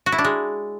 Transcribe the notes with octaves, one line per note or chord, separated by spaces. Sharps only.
F#4
E4
D4
G#3